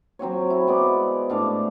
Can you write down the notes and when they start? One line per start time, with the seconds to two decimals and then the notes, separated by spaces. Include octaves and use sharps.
0.19 F#3 C4 F#4 C#5
0.50 E4
0.67 G#3 B3 D5
1.30 A2 D4 F5 D6